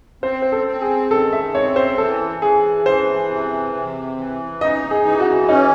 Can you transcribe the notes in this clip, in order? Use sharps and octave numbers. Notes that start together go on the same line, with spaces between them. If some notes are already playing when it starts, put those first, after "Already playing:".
C4 C5
C5
A4
C4
G#4
D#3 A4
E5
C4 C#5
C5
E3 A4
E3 G#4
E3 C5
C3
C3
E3
D#4 D#5
G#4
E3
F#4
C#4 D#4